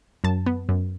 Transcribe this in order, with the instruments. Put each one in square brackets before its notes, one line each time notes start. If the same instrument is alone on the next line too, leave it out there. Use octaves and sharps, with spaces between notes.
[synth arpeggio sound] F#2 A5
B3
F#2